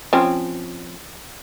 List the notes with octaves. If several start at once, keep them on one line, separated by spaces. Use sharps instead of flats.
F3 C4 C#4